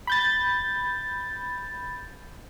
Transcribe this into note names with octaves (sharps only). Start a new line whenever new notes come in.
B5 G6 A6